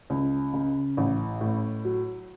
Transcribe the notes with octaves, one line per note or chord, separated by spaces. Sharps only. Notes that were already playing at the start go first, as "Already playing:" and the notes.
C#2
C#3
A1
A2
F#3